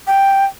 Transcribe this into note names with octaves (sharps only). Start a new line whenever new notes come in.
G5